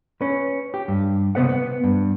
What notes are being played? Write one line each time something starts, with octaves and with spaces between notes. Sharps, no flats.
C#4 B4
G4
G2
C3 D#3 B3 B4 C5 F#5
B3
G2